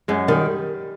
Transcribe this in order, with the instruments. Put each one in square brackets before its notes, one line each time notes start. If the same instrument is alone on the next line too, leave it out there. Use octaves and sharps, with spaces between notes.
[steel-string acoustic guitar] F#2 [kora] G#3
[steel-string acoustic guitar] D#3 [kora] G3